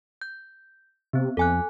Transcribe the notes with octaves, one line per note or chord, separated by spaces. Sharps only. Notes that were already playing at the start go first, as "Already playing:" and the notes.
G6
C3 B3 C4
F2 A4 G#5 F#6